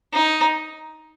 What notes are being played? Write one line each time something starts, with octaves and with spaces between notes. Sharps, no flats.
D#4